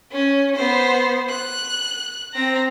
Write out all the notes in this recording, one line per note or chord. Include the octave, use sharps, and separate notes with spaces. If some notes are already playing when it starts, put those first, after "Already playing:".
C#4
B3 C5
F#6
C4 A#5